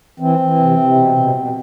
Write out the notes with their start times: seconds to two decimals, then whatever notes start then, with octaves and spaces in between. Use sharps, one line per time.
0.20 E3 C4
0.39 E3
0.59 C3
0.77 C3
0.96 B2
1.15 B2
1.35 B2